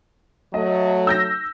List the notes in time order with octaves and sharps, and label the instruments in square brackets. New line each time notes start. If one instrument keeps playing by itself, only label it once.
[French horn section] F#3 A3 [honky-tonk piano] D#5
[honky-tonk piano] E6 G6 A#6